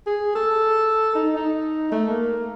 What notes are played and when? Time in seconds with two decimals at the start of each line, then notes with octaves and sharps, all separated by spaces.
0.07 G#4
0.35 A4
1.15 D#4
1.36 D#4
1.92 A3
2.09 A#3